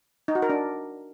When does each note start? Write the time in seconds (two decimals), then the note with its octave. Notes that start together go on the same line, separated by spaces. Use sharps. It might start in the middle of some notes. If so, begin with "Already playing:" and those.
0.28 D#4
0.35 F#4
0.42 A#4
0.50 D4